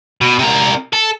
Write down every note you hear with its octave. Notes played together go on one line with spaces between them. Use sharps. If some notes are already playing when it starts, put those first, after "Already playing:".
B2
C3 A#4
A4